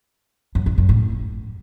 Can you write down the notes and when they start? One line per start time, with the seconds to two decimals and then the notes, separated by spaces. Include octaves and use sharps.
0.55 F#2
0.66 F2
0.78 F#2
0.89 A2